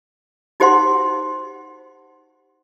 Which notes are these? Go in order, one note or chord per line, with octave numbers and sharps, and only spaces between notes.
D#4 F#4 G4 C5 F#5 C6